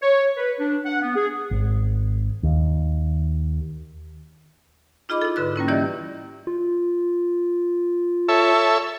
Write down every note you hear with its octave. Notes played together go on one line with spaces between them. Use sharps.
C#5
B4
D4
F#5
B3
G#4
G#1
D#2
D#4 F4 G#4 D#5 B5 D6
E4 A4
G#2 D3 B4 F#6
G3 A#3 C#4 E4
E3 A#3 E4 G4 D5 D#5
F4
A4 C#5 E5